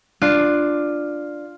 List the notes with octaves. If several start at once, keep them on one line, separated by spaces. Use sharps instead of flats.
D4 F4